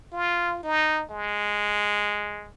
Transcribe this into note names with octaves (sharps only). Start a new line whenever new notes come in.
F4
D#4
G#3